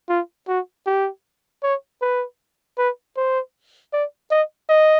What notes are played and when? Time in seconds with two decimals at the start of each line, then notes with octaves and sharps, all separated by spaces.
0.09 F4
0.48 F#4
0.86 G4
1.63 C#5
2.02 B4
2.78 B4
3.17 C5
3.93 D5
4.31 D#5
4.69 D#5